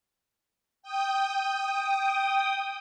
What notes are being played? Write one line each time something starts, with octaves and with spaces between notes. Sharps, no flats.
G5 D#6